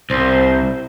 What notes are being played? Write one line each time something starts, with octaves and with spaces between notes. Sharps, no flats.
C2 C5